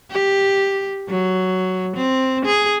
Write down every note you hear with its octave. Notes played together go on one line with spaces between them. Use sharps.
G4
F#3
C4
G#4